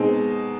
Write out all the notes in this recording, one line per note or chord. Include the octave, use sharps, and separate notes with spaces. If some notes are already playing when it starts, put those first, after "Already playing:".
Already playing: B2 G#3 C4 D#4